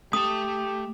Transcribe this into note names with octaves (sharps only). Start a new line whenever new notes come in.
A3 G4 A5 D#6